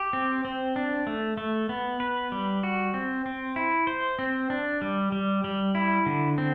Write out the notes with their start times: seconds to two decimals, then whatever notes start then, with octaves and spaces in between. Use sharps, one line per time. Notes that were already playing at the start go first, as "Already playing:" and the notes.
Already playing: G4
0.13 C4
0.45 C4
0.76 D4
1.07 A3
1.38 A3
1.69 B3
2.00 B4
2.32 G3
2.63 F#4
2.94 C4
3.26 C4
3.56 E4
3.87 C5
4.19 C4
4.50 D4
4.82 G3
5.12 G3
5.44 G3
5.75 E4
6.06 D3
6.38 C4